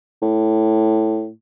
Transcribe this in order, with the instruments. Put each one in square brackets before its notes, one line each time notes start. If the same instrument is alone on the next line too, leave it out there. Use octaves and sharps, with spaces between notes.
[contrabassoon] A2